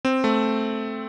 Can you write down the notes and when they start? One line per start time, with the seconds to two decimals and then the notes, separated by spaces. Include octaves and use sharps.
0.05 C4
0.24 A3